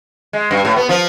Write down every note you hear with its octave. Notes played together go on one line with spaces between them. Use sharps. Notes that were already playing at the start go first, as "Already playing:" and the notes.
G#3
G2
A2
B3
F3